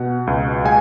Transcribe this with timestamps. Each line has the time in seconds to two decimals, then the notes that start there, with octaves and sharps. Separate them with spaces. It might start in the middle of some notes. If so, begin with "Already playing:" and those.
Already playing: B2 F#5
0.27 C#2
0.65 G#3 G#5